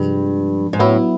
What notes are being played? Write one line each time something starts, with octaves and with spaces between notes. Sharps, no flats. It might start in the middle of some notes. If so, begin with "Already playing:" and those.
Already playing: G2 C3 F3 G#3
G#2
A2 F#3 B3 E4